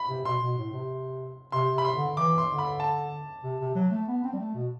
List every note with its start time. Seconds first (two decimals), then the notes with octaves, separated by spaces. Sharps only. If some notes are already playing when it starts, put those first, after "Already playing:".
Already playing: B5
0.09 C3
0.25 B2 C6
0.42 B2
0.58 A2
0.73 C3
1.52 C3 C6
1.74 C3 B5
1.85 C6
1.96 D3
2.17 E3 D6
2.38 C6
2.48 D3
2.58 B5
2.80 A5
3.44 C3
3.60 C3
3.75 F#3
3.91 A3
4.08 B3
4.24 C4
4.33 G3
4.39 A3
4.55 B2